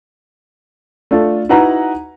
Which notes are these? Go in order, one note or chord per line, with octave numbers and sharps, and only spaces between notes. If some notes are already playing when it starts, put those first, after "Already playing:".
A3 D4 F4 A4
D#4 E4 F#4 B4 F#5 A#5